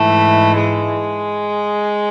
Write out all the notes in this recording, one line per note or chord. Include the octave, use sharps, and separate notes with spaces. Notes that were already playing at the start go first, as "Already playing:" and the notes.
Already playing: G#2 E3 A3
G#3